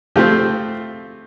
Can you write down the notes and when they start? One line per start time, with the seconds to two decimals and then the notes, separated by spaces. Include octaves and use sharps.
0.16 F3 A3 C4 F4 G4